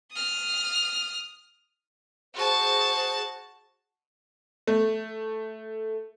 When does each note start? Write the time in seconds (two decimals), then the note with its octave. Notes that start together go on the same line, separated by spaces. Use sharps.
0.12 D#6 F6
2.34 F#4 G#4 C5 A5
4.67 A3